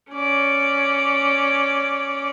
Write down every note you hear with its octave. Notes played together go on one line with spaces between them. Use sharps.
C#4 D5